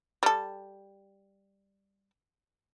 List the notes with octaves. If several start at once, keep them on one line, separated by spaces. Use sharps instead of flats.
G3 A4